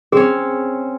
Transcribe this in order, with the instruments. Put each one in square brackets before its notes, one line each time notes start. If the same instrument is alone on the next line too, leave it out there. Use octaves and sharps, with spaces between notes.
[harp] C4 C#4 [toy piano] G#4